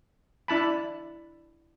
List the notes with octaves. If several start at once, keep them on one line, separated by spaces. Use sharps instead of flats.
D4 E4 A5 B5